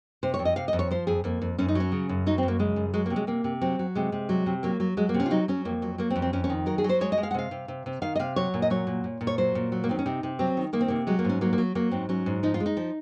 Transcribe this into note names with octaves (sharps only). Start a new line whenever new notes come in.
C3 C5
C#5
F2
D#5
C3 F5
D#5
F2
C#5
F3 C5
F2 G#4
F2 A#3
F2
F#2 C#4
D#4
F#3 C#4
C#3
F#2
F#3 D#4
C4
F#2
A#3
C#3 G#3
F#2
F#3 G#3
A#3
C3
G#3
C3 A#3
C3
F#3 C4
F#3
C3 G#3
C3
F#3
C3
F#3 A#3
F#3
F#3 G#3
A#3
C3
C#4
F4
F#3 D#4
F#3 C#4
F2 A#3
F#3
F#3 A#3
C4
F2
C4
F2 C#4
C#4
D#3
F#3 A#4
G#4
F#3
C5
G#3 C#5
D#5
G#3
F5
F#5
C3 F5
C3
C3
C3
D#3 F5
D#5
C3 F5
F#3 C#5
A#2
D#5
F#3 C#5
A#2
A#2
A#2
C#5
F#3 C5
A#2
F#3
A#3
D#3 C4
C#4
C3 D#4
C3
F#3 C4
D#3
D#3 A#3
C4
C3 A#3
F#3 G#3
A#3
G#2
C#4
F#3 A#3
A#3
F#3
F#3 A#3
G#2 C4
F#3 C#4
G#2
F3 D#4
F4
G#3
D#4
F3